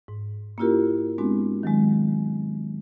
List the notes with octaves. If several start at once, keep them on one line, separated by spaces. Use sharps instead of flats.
G#2
A#3 C#4 E4 F4 G4 A#4
G#3 B3 C4 D4 F#4
D#3 F#3 G#3